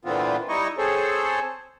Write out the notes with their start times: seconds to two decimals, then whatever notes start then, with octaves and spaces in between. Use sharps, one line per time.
0.05 A#2 D3 E3 B3 C4 F4
0.49 G3 D#4 E4 D#5 C#6
0.78 C4 G#4 A4 C5 C#5